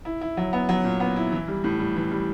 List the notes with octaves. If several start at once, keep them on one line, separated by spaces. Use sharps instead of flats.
E4
E4
F#3
B3
F#3
A#2
B3
E4
E3
G3
A2
G3
E3
G3